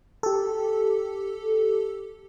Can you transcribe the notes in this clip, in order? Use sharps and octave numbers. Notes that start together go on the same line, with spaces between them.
G4 A4